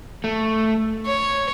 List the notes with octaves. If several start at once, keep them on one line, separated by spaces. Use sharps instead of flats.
A3
C#5